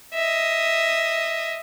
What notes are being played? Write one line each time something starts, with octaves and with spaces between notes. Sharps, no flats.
D#5 E5